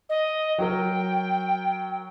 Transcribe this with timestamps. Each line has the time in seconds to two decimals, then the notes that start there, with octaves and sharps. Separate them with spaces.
0.09 D#5
0.58 F#3 A#4 G5